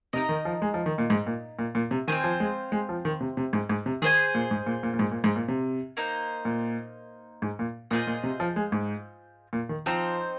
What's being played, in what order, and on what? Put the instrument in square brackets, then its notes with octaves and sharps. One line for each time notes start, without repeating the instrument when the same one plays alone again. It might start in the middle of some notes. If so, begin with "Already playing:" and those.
[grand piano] C3 [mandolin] D#4 A#4 D#5
[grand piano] D#3
F3
G#3
F3
D#3
A#2
G#2
A#2
A#2
A#2
C3
[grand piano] D#3 [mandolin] C4 F4 C5 G#5
[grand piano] F3
G#3
G#3
F3
D#3
C3
C3
G#2
G#2
C3
[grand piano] D#3 [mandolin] G#4 C5 G#5
[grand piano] A#2
G#2
A#2
A#2
A#2
G#2
A#2
G#2
A#2
C3
[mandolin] A#3 D#4 C5
[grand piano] A#2
G#2
A#2
[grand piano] A#2 [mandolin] F4 G#4 C5 D#5
[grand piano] A#2
C3
F3
G#3
G#2
A#2
D#3
[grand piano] F3 [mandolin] C4 D#4 C5